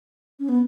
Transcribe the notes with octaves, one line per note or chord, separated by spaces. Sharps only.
C#4
B3